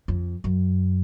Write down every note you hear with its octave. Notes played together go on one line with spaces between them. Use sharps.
F2
F#2